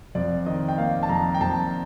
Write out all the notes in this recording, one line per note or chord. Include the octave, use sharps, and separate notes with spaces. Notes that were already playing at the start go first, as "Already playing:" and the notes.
F2 D5
D#3 D#5
G5
A#3 F5
A5
F2 A#5
G5
F2 A5